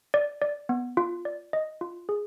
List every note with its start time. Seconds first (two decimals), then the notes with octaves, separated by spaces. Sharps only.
0.14 D5
0.42 D5
0.69 B3
0.97 F4
1.25 D5
1.53 D#5
1.81 F4
2.09 G#4